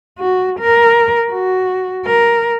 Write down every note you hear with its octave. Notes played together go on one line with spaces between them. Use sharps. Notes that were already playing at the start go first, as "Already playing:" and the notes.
F#4
A#4
F#4
A#4